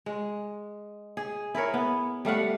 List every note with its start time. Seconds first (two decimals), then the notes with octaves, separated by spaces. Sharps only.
0.06 G#3
1.17 G#4
1.55 E4 G#4 A#4 C#5
1.74 B3
2.25 G3 A3 F5 F#5